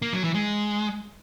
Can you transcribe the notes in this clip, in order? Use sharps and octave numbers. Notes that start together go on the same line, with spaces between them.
A#3
F#3
E3
G#3